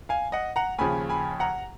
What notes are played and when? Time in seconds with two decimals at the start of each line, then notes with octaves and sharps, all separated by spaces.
0.09 F5 G#5
0.32 D#5 F#5
0.56 F#5 A#5
0.78 D#2 C#3 F3 G#5 B5
1.09 G#5 B5
1.40 F#5 A#5